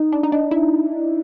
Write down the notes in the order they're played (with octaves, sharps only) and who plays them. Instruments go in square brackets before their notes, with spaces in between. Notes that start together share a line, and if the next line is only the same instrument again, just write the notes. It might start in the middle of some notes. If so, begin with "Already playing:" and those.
Already playing: [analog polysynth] D#4
D4
D#4
D4
E4